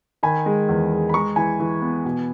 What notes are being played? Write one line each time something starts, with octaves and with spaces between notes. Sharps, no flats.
D#3 G#5 B5
G#3
E2
G#3
B5
G#3 A#5 C#6
E3 G#5 B5
E3
B3
B2